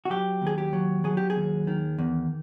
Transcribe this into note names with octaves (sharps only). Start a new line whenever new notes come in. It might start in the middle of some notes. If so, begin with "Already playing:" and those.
F#4
F#3 G4
D#2 G#4
G4
F#3
F#3 G#4
G4
G#4
D#2
D#3
E2